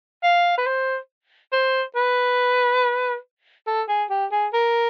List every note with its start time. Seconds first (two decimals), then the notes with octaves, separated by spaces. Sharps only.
0.23 F5
0.58 B4
0.66 C5
1.52 C5
1.96 B4
3.67 A4
3.88 G#4
4.10 G4
4.32 G#4
4.53 A#4